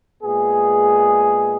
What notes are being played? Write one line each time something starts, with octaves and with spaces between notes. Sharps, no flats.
A#2 G#3 B3 G#4